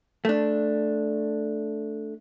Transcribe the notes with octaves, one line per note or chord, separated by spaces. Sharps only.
A3 D4